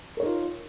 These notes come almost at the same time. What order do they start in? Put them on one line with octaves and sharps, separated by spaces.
A#4 C#5 D#4 F4